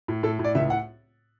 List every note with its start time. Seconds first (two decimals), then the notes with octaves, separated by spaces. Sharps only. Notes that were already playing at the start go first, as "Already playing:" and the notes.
0.08 A2
0.23 A2 A4
0.39 A2
0.45 D5
0.55 C#2 E5
0.70 F#5